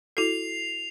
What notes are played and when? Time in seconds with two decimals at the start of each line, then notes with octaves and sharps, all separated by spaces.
0.17 E4 F#4 A4 C7 F7